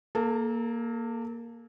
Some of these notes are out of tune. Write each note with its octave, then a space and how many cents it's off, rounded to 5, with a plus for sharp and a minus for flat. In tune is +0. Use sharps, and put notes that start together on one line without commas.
A#3 +0 A4 -35 A5 +45